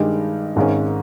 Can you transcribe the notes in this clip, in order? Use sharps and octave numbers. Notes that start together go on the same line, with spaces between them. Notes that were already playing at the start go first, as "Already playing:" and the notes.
Already playing: G2 D#3 G#3 D#4 G4
G#1 G#2 D#3 G#3 C#4